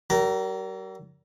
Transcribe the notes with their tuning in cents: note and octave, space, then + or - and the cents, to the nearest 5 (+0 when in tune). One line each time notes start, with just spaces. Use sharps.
G3 -45 A#4 +0